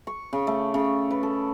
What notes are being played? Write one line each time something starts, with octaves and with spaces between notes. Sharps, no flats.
C#6
C#3
A3
C#3
B4
A4